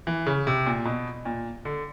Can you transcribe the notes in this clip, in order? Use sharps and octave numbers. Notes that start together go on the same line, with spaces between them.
E3
C#3
C3
A#2
B2
A#2
D3